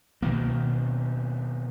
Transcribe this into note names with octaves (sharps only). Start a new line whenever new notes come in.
B2 D#3 A#3